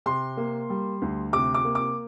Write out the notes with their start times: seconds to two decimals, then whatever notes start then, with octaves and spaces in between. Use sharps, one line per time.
0.06 C3 C6
0.37 A#3
0.70 G3
1.02 D2
1.33 C3 D6
1.54 D6
1.65 A#3
1.75 D6